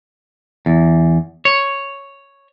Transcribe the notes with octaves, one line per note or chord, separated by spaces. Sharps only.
E2
C#5